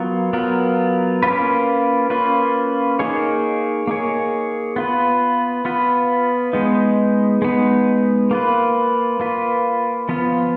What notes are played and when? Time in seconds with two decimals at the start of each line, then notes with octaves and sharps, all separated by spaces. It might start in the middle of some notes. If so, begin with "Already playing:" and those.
Already playing: F#3 B3 F4 A#4
0.33 F#3 B3 F4 A#4
1.23 A#3 C#4 F4 B4
2.10 A#3 C#4 F4 B4
2.99 A#3 D#4 G#4 C#5
3.88 A#3 D#4 G#4 C#5
4.76 B3 F4 B4
5.65 B3 F4 B4
6.53 G#3 B3 D#4
7.42 G#3 B3 D#4
8.31 A#3 F4 B4
9.20 A#3 F4 B4
10.09 F3 B3 F4